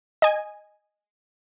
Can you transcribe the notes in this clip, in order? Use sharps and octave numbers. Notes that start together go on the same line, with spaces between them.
D#5 G#5